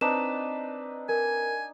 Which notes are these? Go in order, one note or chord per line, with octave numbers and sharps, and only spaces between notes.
C4 D4 D#4 B4 A5 E7
A#4 G#5